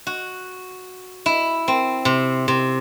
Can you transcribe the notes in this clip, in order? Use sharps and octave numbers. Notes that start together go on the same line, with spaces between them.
F#4
E4
C4
C3
C3